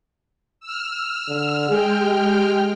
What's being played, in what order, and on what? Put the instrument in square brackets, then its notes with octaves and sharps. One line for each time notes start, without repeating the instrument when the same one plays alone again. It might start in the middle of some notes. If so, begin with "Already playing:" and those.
[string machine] E6 F6
[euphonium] D3
[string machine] G#3 G5 F6 [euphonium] G#4
[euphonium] G4